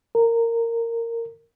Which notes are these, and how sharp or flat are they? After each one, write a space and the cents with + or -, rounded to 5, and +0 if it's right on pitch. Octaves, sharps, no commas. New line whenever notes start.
A#4 -15